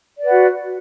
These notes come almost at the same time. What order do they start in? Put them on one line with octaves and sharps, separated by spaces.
D5 B4 F#5 F#4